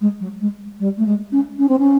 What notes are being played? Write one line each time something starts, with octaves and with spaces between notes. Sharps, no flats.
G#3
F#3
G#3
G3
A3
G#3
C#4
C#4
C4
C#4